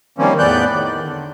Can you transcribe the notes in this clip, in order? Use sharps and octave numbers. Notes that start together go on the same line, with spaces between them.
D#3 F3 G3 A#3 C4 C#4
E2 A2 B3 D5 F#6 G6
D#3
D3